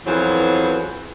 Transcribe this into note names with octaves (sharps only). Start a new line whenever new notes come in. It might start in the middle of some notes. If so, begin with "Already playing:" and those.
F2 E3 F#3 B3 G#4 C5